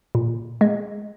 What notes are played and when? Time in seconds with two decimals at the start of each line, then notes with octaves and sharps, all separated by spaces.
0.15 A#2
0.61 G#3